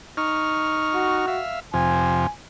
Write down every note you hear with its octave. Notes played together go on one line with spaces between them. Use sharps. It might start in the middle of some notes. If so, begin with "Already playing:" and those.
D#4 C#6 F6
F#4
E5 F5
F2 C3 F3 G#5